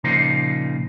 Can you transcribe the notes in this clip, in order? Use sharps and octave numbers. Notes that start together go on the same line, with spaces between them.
A#2 C#3 F3 A#3 D#4 C5